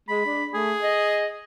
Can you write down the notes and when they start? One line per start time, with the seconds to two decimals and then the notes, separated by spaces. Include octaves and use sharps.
0.08 G#3 B5
0.26 D4
0.54 A3 G#4
0.82 D#5